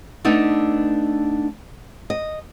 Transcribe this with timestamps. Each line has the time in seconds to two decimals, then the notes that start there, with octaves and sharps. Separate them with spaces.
0.25 A3 B3 D4 D#4
2.10 D#5